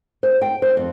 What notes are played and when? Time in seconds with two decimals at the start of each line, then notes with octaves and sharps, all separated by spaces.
0.23 C5
0.41 G5
0.62 C5
0.77 F2